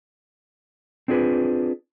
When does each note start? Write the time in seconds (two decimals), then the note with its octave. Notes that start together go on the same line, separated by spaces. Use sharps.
1.08 C4 D4 F4 G#4 B4